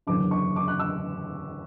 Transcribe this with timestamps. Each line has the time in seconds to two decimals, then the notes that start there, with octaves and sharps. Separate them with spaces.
0.07 F#1 E2 D3 D6
0.31 C#6
0.56 D6
0.68 F#6
0.79 E6